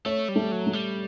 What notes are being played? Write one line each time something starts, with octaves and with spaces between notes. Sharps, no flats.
A3 C#5
G3
A3
F#3
A3
G3